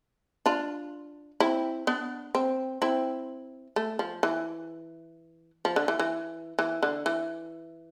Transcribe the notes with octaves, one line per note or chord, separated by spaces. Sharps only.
D4 F4
C4 E4
B3 D4
C4
C4 E4
A3
F3
E3
F3
D3
E3
E3
E3
D3
E3